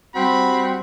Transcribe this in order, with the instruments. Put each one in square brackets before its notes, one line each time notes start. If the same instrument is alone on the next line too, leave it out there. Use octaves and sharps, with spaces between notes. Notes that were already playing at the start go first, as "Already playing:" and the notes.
[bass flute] G3 [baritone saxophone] C4 [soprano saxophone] F#4 [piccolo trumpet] B5